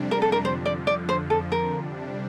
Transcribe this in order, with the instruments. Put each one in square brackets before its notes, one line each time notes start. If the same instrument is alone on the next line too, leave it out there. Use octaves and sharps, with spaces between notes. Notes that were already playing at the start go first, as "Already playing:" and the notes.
Already playing: [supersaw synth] F2 C3 G3 D4
[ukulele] A#4
A4
A#4
[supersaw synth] F2 D3 F3 [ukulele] C5
[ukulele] D5
D5
C5
A4
A#4
[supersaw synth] C3 G3 D4